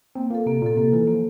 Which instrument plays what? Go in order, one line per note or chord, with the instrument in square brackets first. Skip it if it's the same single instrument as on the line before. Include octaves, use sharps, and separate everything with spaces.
[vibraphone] A#3 [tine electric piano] C4
[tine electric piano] A#3 [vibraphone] F4 A4
[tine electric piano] C3 [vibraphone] A#3
[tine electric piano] A#2 [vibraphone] F4 A4
[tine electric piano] C3 [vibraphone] A#3
[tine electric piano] E3 [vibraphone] F4 A4
[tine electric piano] F3 [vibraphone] A#3